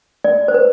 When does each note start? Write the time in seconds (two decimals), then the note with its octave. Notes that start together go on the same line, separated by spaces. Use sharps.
0.24 D5
0.48 C5
0.54 B4